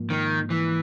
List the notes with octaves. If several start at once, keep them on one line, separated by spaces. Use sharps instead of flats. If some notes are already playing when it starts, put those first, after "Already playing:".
Already playing: G#2 F3 A#3
D#3
E3